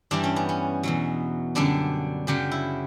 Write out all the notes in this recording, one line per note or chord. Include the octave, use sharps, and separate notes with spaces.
G2 E3 G3 D4
C#4
B3
C#4
E2 B2 F#3
F#2 D3 G3 D4
F#2 C#3 F#3 G4
E4